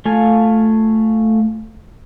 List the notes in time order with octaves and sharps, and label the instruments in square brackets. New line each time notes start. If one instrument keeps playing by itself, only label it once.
[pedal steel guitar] A3 F4 F5 G#5